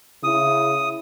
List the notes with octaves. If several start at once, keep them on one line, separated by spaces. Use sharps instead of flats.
C#3 E4 D#6